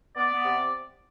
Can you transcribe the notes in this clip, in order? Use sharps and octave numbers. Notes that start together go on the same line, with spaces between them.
B3 D5
B3
C3